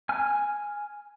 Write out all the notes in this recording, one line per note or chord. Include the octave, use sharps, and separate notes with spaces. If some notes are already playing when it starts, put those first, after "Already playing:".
G#5 F6